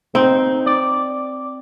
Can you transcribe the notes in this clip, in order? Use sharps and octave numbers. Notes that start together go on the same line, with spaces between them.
C4 D#4
D5